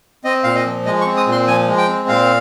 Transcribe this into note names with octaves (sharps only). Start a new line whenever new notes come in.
C4 D#5
A#2 F5
D#5
F3
G#3 D#5
C#6
C4
D#6
A#2
C6
F3 G#5
G#3
G5
C4
A#2 F5